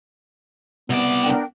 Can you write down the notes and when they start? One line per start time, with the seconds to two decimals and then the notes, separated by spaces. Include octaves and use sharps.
0.90 C2 B3 D5
1.23 D4 A#4 G5